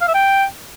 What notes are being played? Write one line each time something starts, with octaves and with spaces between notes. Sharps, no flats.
F5
E5
G5